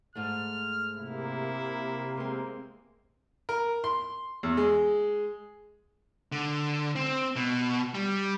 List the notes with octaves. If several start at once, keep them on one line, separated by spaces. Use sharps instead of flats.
G#2 A3 F6
C3 A#3 E4
G#3 C4
A#4
C6
E2
G#3
D3
C4
B2
G3